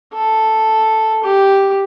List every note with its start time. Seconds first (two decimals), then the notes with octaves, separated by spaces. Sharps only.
0.13 A4
1.23 G4